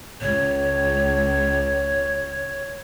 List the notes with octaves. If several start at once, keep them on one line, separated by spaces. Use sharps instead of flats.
C#2 C#5